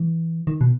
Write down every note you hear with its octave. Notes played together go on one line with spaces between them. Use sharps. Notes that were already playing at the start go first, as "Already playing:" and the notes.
Already playing: E3
D#3
B2